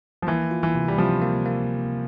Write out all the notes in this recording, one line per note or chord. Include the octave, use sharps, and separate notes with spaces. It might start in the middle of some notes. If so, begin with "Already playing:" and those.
F3
E3 A#3
F4
E3
C3
G3
C3 F3
A#3
A#3